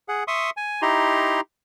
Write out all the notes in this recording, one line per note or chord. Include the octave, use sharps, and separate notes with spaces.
G#4 F#5
E5 C6 C#6 D#6
G#5
D#4 E4 G4 A#5 C6